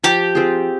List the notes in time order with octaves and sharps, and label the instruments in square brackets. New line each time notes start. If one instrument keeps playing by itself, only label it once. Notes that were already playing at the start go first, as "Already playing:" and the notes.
[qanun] F3 [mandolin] G4
[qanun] C4 F4 G#4